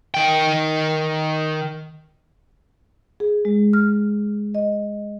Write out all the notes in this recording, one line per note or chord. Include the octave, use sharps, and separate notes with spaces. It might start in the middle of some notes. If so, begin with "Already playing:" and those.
D#3 G5
G#4
G#3
F6
D#5